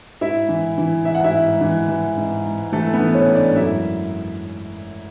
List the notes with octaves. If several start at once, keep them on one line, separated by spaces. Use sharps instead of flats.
G#2 E4 E5
E3
E3
G#2 E5
F#5
E4 E5
G#2
E3
E3
G#2
G#2
E3 A3 A4
B3 B4
E3
C#4 C#5
G#2
D4 D5
F#2 E4 E5